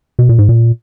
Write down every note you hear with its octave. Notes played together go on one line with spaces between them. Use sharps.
B2
A#2
G#2
A#2